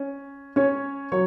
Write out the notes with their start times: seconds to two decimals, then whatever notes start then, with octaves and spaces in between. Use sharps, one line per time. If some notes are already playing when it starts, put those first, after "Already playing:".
Already playing: C#4
0.56 C#4 C#5
1.12 F#3 C#5